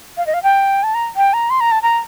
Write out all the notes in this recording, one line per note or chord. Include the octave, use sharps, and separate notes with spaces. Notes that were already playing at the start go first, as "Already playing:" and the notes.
F5
D#5
F5
G5
A5
A#5
G5
A#5
C6
A#5
A5
A#5